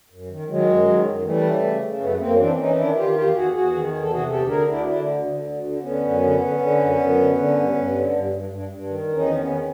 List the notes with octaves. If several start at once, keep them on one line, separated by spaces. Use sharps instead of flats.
F#2
D#3
D#3 F#3 G#3
F#2
D#3
F#2
E3 G3 A3
C#3
C#3
C#3
F#2 A3 B3
F#2 A#3 C4
C#4
E3 C4 D4
E3 C#4 D#4
D#3 D4 E4
D#3 F4 G4
E2 F4 G4
E2 F#4 G#4
E2 F#4 G#4
D#3
E2 G#4
A4
C3 F#4 G#4
D2 G4 A4
D3 G#4 A#4
D2 D4 E4
D3 D4 E4
D2
D3
D2
D3
D3 B3 C#4
F#2
D3
D3
D3
F#2
F#2
D3
D3
G2
G2
D3
G2
G2
G2
G2
D#3
E2
C#4 D#4
D#3
C4
B3 C#4
D#3